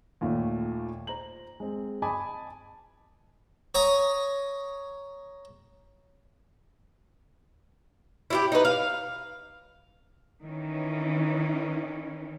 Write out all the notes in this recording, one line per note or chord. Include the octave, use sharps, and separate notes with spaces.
D#2 A#2 D#3 A3
C5 A#5 F#7
G#3 C4
D#5 G#5 A5 B5 D6 D#6
C#5 G#5 A#5 C#6 D#6
E4 F4 G4
D#4 B4
F5
D#3 E3 C#4